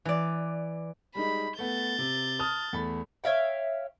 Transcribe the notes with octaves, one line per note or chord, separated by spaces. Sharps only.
E3 D5
G3 G#3 D#4 B5
A3 B3 G6 A6
C3
A5 D#6 F6
E2 A3 B5
C#5 E5 F5 G5